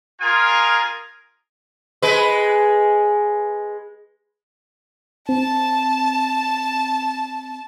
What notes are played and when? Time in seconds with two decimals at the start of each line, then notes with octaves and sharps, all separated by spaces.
0.21 F4 G#4 A#4 G#5
2.02 G#3 B4
5.29 C4 A5